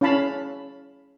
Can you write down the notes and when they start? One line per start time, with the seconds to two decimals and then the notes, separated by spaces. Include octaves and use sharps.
0.01 C#4 E4 F5 A5 B5